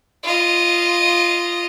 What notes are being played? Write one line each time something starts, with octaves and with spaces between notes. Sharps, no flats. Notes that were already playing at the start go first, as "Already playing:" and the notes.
F4 D#5